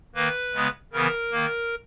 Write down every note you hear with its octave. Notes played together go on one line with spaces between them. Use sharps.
D#3 A#3 B4
C#3 G#3 B3
C#3 E3 B3 A#4
D#3 A#3